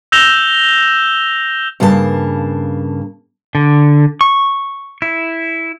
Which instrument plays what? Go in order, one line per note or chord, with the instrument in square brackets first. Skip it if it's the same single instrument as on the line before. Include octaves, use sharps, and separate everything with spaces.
[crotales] E6 G6 A#6 E7 F7 G7
[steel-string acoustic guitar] G2 C#3 A#3 B4 A5
[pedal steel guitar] D3
C#6
E4